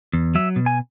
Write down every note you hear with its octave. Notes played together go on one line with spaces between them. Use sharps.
E2
F#3 E5
B2
G#5